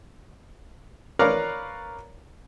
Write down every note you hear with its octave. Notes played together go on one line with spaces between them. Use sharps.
A#4 B4 C#5 D5 F5 A#5